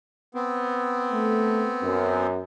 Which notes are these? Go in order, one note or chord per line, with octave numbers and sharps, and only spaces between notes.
B3 C4
A3
F#2